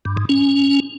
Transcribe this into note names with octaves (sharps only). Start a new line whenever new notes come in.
G2
G#2
C#4